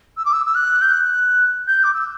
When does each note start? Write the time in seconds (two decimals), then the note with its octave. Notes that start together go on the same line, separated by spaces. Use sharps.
0.17 E6
0.25 D6
0.32 E6
0.46 E6
0.54 F#6
0.81 G6
0.91 F#6
1.67 G6
1.83 D6
1.94 E6